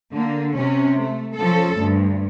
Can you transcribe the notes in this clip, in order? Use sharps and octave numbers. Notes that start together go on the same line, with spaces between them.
D3 A#3
C3 C#4
A3
F3 C#4 A4
D2 G2